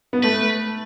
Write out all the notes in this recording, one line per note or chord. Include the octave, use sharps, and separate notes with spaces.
B3
A3 B4